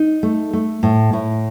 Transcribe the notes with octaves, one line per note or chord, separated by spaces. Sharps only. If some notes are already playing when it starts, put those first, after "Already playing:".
Already playing: D#4
A3
A3
A2
A2